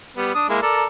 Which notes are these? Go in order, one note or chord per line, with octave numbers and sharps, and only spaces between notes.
G3 B3
D4 D#6
G#3 A#3 E4
A4 A#4 D5